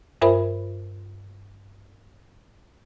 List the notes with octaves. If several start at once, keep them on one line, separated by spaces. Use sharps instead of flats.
G2 F4 A#4 C5 E5 B5